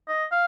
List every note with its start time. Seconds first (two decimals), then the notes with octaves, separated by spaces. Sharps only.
0.08 D#5
0.31 F5